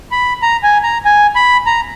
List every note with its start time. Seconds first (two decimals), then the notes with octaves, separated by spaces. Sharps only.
0.11 B5
0.42 A#5
0.63 G#5
0.84 A#5
1.05 G#5
1.36 B5
1.66 A#5